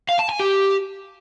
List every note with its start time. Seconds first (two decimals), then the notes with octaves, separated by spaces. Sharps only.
0.09 F5
0.19 A5
0.29 G#5
0.40 G4